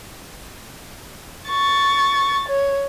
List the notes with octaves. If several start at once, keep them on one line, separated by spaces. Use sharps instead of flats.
C#6 A6
C#5